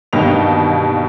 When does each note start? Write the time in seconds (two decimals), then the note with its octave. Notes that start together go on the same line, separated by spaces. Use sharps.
0.13 G1 D#2 B2 G3 D#5 F7